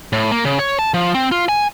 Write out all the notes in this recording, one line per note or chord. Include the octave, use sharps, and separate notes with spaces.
A2
A#3
C#3
C#5
A5
F3
C4
F4
G#5